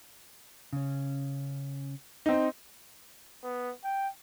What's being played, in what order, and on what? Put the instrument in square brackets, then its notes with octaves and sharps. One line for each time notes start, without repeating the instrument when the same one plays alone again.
[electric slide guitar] C#3 C#4
[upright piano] C4 D#4
[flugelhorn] B3
G5